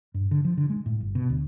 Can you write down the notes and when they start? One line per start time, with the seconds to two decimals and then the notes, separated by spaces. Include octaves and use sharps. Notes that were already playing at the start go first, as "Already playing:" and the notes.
0.14 G2
0.31 D3
0.45 F3
0.57 D3
0.70 G#3
0.86 A2
1.01 G1
1.15 B2
1.30 D2